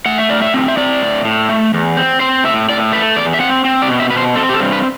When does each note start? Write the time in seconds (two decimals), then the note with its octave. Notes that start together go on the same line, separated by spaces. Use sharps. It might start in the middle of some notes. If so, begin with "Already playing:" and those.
0.06 A3 F#5
0.18 E5
0.29 A2 D5
0.42 E5
0.54 C4
0.68 E5
0.77 C4 D5
1.02 A2
1.25 A2
1.49 A3
1.74 E2
1.97 C4
2.20 C4 C5
2.44 A2 E5
2.69 A2 D5
2.92 A3 B4
3.16 E2 D5
3.34 E5
3.40 C4 F#5
3.65 C4
3.82 D5
3.88 B2
4.00 E5
4.11 B2 B4
4.17 C5
4.36 C4 A4
4.49 G4
4.53 A4
4.60 G2
4.72 B4